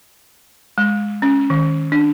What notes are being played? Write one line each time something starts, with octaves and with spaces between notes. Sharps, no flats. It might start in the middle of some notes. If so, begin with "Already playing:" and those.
G#3
C#4
D#3
D4